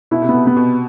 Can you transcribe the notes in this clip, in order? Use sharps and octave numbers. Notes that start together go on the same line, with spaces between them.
B2 E4
C3
B3
B2
C3 B3
B2